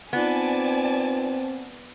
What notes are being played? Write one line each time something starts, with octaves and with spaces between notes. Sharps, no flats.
B3 C4 D#4 F4 B4 D5 G#5 A5